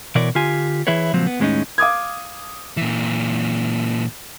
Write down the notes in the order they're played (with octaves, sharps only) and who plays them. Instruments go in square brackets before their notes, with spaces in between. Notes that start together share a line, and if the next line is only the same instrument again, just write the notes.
[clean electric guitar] B2 E3 A#4 C#5 D5
D3 F4 G4 G#5
E3 E4 G#4 B4 C#5
C#2 A#2 F3 F#3 C4
B3
D#2 A2 G#3 B3 C#4 D#4
[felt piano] F5 D6 D#6 G#6
[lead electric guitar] A#2 E3